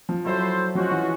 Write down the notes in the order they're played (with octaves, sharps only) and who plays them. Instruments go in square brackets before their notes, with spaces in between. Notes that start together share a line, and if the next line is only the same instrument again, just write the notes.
[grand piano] F3
[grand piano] F#3 [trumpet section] E4 A4 C5
[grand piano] F3 [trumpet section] G#3 C#4 F#4
[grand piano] E3